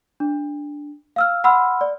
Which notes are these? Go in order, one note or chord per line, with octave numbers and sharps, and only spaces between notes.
D4
F5 E6 F6
F#5 B5 C6 E6 F6
D5